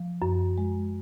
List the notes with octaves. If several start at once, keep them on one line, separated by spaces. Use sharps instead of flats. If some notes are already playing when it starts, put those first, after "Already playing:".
Already playing: F3
F#2
G#3